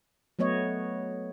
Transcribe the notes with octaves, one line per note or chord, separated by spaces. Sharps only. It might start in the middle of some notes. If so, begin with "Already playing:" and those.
F#3 A3 B3 C#5 D#5